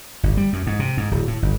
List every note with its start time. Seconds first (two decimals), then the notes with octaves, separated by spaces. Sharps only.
0.23 G1
0.37 G3
0.53 F#2
0.67 G#2
0.79 C3
0.97 G#2
1.11 D1
1.28 A2
1.42 G1